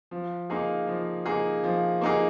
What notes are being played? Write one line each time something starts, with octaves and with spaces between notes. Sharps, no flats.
F3
A#3 D#4 G#4
F3
A#3 D#4 G#4
F3
A#3 D#4 G#4